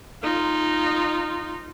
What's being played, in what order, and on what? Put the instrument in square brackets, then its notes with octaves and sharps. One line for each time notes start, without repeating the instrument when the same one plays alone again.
[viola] D#4 F4